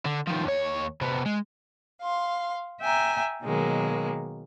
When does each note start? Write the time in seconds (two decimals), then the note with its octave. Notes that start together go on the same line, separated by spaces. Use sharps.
0.06 D3
0.28 D#3 F3
0.45 D#2 C#5
1.01 C3 B3
1.26 G#3
2.02 F5 C6
2.81 E5 G5 G#5 A#5
3.42 B2 D#3 F#3 G#3 A#3